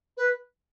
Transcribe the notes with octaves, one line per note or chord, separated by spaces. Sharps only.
B4